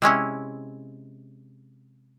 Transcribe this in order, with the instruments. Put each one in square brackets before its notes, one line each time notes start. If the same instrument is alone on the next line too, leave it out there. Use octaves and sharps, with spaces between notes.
[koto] C3 G#3 C#4 E4